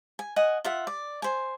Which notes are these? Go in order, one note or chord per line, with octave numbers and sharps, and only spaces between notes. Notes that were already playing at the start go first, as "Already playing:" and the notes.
G#5
D#5 F#5 G#5
F4 E5 F#5
D5
C5 G#5